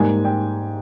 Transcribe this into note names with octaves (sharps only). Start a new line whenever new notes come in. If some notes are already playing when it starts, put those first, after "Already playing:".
Already playing: G#2 G3 A#3 G#5
G5